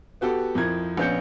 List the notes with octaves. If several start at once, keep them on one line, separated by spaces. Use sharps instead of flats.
B3 F#4 G4 A4
F2 F3 E4 A#4 G#6
A#1 B3 C#4 G6 C#7